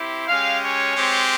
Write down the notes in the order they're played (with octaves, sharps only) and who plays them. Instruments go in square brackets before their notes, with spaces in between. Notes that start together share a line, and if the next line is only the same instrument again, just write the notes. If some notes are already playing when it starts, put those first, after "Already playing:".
Already playing: [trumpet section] C4 E4 G4
G#3 C#4 G4 F5
C#5
G#3 C4 G4